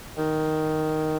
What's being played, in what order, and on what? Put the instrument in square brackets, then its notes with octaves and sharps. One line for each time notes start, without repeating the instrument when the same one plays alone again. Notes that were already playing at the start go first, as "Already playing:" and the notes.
[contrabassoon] D#3